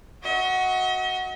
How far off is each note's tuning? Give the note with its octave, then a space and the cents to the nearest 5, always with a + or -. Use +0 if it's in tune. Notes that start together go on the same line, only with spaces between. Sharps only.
F#4 +0 D#5 +40